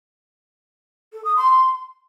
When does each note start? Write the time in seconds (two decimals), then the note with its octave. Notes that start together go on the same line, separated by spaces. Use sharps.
1.13 A4
1.25 D#6
1.36 C6